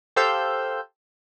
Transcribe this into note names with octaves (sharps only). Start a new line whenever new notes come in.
G4 A4 C5 F5 E6 G6